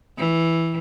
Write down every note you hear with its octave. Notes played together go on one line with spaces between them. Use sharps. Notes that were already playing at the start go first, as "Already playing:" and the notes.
E3